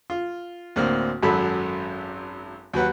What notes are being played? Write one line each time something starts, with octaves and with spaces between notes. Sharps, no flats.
F4
D2 A2 A#3 C4 F6
G#1 F#2 F#3 A4 B5
D#2 F#3 B4 F#5